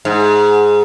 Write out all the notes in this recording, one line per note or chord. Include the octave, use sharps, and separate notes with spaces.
G#2